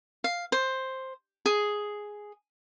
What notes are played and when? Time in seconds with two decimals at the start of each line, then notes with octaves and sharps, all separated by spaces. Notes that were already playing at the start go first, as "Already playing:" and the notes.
0.24 F5
0.52 C5
1.46 G#4